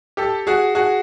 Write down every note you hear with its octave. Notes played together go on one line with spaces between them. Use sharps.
G4 A4
F#4 G#4
F#4 G#4